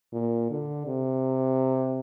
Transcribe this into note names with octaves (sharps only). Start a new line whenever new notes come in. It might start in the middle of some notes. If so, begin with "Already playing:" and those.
A#2
D3
C3